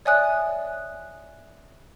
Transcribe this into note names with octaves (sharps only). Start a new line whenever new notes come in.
C#5 D5 E5 G#5 D#6 F#6